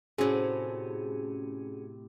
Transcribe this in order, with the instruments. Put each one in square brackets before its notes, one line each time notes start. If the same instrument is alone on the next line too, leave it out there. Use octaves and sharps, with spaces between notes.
[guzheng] A2 C3 [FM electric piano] C#4 F#4 G#4